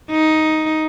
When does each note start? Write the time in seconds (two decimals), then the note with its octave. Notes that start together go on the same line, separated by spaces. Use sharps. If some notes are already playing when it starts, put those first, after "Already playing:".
0.11 D#4